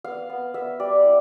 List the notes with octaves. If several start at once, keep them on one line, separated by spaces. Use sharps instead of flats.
B3 F5
B3
B3 E5
G3 D5
E4